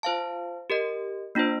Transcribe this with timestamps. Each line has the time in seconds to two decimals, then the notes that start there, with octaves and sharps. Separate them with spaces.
0.03 F4 C5 F5 A5
0.70 G4 A#4 D#5
1.35 A#3 D4 F4 C5